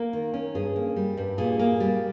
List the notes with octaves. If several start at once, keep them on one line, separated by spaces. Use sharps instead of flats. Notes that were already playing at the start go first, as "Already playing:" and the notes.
Already playing: A#3 A#4
D#3
C#4
G2 G#4
A#3
G3
G2
A#2 G#4
A#3
G3